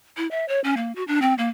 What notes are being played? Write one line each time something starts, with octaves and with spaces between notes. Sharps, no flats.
E4
E5
C#5
C#4
A#3
F#4
D4
C4
A#3